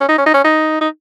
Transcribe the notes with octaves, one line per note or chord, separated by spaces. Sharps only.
C#4
D#4
C#4
D#4
C#4
D#4
D#4